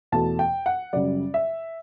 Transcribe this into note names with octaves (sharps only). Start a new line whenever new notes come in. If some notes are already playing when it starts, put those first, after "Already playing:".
E2 B2 A3 A5
G5
F#5
F#2 C#3 G3 D5
E5